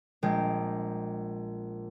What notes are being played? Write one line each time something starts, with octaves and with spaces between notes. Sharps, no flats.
A#1 G#3 G5